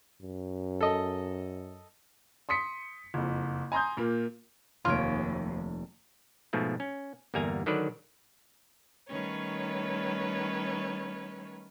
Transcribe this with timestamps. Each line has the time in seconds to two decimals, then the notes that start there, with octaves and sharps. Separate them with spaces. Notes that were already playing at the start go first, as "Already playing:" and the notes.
0.22 F#2
0.81 A4 D#5
2.49 C6 D#6 B6 C#7
3.14 F#1 F2
3.72 G#5 A#5 C6 D#6 G6
3.97 A#2 A#3
4.85 F1 D#2 A3 F4 C#5 D7
6.53 G#2 B2 F3 A3
6.80 C#4
7.34 G1 E2 G3 A#3 G#5 A#5
7.66 D3 D#3 F#3 A4 B4 D5
9.09 D#3 G3 A3 C#4 B4 C#5